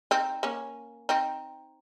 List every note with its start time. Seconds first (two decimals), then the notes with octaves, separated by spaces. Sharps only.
0.11 C4 D#4
0.43 A#3 C#4
1.09 C4 D#4